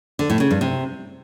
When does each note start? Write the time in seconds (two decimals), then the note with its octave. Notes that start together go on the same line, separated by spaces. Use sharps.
0.19 D3
0.30 A2
0.40 C#3
0.51 G2
0.61 C3